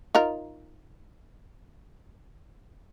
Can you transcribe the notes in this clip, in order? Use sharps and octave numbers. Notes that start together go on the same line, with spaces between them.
D#4 F4 A#4